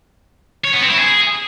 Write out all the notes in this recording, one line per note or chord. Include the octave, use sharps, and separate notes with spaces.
C#5
B3
C4
E4
G#4